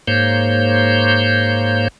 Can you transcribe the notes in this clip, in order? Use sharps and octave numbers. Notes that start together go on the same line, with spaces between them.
G#2 A#3 C5 C#5 G6